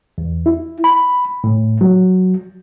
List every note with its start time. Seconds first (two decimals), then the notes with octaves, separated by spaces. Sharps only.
0.18 E2
0.46 E4
0.84 B5
1.44 A2
1.81 F#3